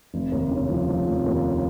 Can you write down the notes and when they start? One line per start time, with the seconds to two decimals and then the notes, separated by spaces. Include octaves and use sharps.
0.14 F1
0.32 D#2
0.51 C#3
0.70 F3
0.89 F3
1.07 F1
1.26 D#2